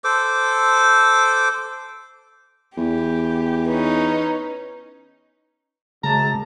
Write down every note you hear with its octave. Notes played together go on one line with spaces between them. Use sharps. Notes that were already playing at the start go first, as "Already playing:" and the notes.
A4 C5 D6
E2 G4
C#4 D#4 B4
F#2 C#3 G#3 A5 A#5